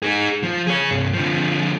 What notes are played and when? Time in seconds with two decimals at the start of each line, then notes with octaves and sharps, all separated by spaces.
0.03 D#4 G#4
0.43 F3
0.67 G#4 C#5
0.91 C2 G2
1.14 D3 F3